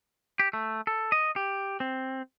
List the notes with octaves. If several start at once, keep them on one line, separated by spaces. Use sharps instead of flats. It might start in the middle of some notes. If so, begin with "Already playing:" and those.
G4
A3
A4
D#5
G4
C4